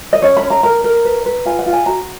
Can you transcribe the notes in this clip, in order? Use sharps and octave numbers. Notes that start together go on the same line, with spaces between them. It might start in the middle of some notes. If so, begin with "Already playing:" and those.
D#5
C#4 C#5
B5
C#4
A#5
A#4 A#5
A#4
B4
B4
F4 G#5
F#5
F4
G#5
F#4 A#5